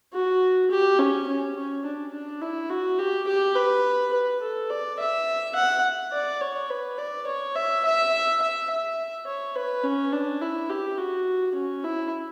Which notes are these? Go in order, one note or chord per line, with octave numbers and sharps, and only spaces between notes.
F#4
G4
C#4
C#4
C#4
D4
D4
E4
F#4
G4
G4
B4
B4
A4
D5
E5
F#5
D5
C#5
B4
D5
C#5
E5
E5
E5
E5
C#5
B4
C#4
D4
E4
G4
F#4
C#4
E4